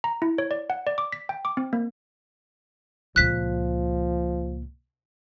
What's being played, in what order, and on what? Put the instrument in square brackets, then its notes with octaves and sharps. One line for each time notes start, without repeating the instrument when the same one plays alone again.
[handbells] A#5
E4
C#5
D5
F#5
D5
D6
B6
G5
D6
C4
A#3
[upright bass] C#2 A#2 [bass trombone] F3 [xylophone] F#6 B6